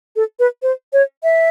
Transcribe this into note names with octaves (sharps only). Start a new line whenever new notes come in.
A4
B4
C5
C#5
E5